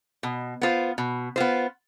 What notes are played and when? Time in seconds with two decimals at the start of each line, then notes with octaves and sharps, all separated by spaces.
0.23 B2
0.61 B3 F4 C5
0.98 B2
1.36 B3 F4 C5